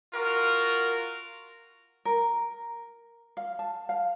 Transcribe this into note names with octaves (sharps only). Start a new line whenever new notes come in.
F4 F#4 A#4
A#4
F5
A5
F5